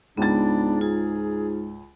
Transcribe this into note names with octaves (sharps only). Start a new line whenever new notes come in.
C#2 G#2 B3 D4 A6
F4 G#4